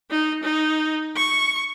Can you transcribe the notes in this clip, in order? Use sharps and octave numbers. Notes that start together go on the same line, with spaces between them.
D#4
D#4
C#6